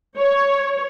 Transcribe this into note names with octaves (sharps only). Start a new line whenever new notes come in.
C#5